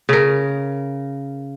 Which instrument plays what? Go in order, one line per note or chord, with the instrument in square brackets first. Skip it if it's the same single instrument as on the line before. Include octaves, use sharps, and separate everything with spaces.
[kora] C#3 A#4